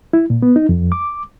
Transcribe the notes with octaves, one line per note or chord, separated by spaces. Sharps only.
E4
A#2
B3
D#4
F2
D6